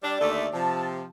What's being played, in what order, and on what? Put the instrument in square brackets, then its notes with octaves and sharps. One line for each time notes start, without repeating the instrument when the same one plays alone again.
[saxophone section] G3 D4 [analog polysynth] D5
[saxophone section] D#2 D3 A3
[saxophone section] C3 F3 [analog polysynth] A5